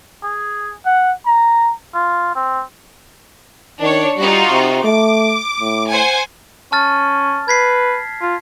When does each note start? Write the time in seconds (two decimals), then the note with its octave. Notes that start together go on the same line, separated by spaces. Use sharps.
0.23 G#4
0.85 F#5
1.26 A#5
1.94 F4
2.35 C4
3.81 D#3 D4 C#5
4.18 G3 D#4 F4 F#4
4.50 C3
4.84 A3 D6
5.60 A2
5.89 C5 F#5 G#5
6.72 C#4 A5 F6 A6
7.48 B4 G#6 B6 C7
8.21 F4